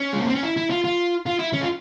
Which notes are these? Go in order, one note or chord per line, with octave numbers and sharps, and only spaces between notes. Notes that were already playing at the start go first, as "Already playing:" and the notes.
Already playing: C#4
G#3
A#3
C4
C#4
E4
E4
F4
F4
F4
E4
C#4
F4